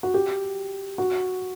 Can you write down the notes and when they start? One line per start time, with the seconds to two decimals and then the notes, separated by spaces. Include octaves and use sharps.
0.03 F#4
0.14 G4
0.98 F#4